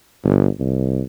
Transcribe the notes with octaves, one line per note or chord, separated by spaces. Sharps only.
G1
C2